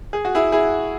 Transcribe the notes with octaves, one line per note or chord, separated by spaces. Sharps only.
G#4
F#4
E4 G#4
E4 G#4